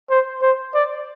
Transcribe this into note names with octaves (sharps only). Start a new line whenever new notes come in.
C5
C5
D5